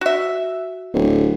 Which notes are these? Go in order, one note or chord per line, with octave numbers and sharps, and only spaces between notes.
F#4 E5
D1